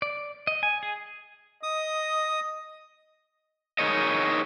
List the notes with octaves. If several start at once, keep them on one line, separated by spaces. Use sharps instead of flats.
D5
D#5
G#5
G#4
D#5 D#6
D#4 G#4 A#4 C#5 D#5